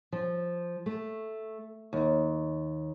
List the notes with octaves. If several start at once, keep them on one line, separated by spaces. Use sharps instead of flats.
F3
A3
D#2